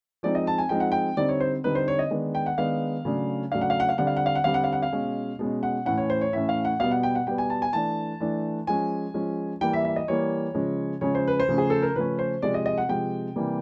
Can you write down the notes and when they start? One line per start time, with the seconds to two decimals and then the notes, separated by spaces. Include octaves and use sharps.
0.23 F3 G#3 C4 D#4 D5
0.35 D#5
0.47 A5
0.58 G#5
0.69 F3 G#3 C4 D#4 G5
0.80 F#5
0.92 G5
1.17 D3 G3 C4 D#4 D5
1.29 C#5
1.40 C5
1.64 D3 G3 C4 D#4 B4
1.75 C5
1.88 C#5
1.99 D#5
2.11 D#3 G#3 B3 D4
2.35 G5
2.46 F#5
2.58 D#3 G#3 B3 D4 F5
3.05 C#3 F#3 A3 D4
3.52 C#3 F#3 A3 D4 F5
3.61 F#5
3.70 F5
3.80 F#5
3.89 F5
3.98 D3 G3 C4 F#5
4.07 F5
4.17 F#5
4.26 F5
4.35 F#5
4.44 D3 G3 C4 F5
4.54 F#5
4.64 F5
4.73 F#5
4.82 F5
4.92 B2 G#3 C#4
5.39 B2 G#3 C#4
5.63 F#5
5.86 A2 E3 A3 C#4 F#5
5.98 C#5
6.10 C5
6.21 C#5
6.33 A2 E3 A3 C#4 E5
6.49 F5
6.65 F#5
6.79 B2 G3 B3 F5
6.91 F#5
7.03 G5
7.15 F#5
7.27 B2 G3 B3 G5
7.38 G#5
7.50 A5
7.62 G#5
7.73 E3 A3 D4 A5
8.20 E3 A3 D4
8.67 F3 G#3 C#4 G#5
9.14 F3 G#3 C#4
9.61 E3 G3 A#3 G5
9.73 E5
9.85 E5
9.96 D#5
10.08 E3 G3 A#3 C#5
10.55 C#3 F3 G#3 C#4
11.01 C#3 F3 G#3 C#4 C#5
11.15 C5
11.28 B4
11.40 C5
11.49 C#3 F3 A3 C#4
11.58 G#4
11.70 A4
11.82 A#4
11.95 C#3 F3 A3 C#4 B4
12.19 C5
12.42 C3 F3 G#3 D5
12.54 D#5
12.66 D#5
12.78 F#5
12.89 C3 F3 G#3 G5
13.36 C3 E3 G3 A#3